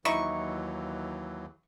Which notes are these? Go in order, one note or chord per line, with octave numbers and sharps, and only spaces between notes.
D#2 E3 F#3 D#4 E4 C#6